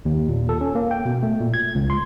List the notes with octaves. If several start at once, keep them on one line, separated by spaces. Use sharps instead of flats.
D#2
A#2
A4
C#4
A#3
G5
B2
A3
A#2
G#6
C#2
C6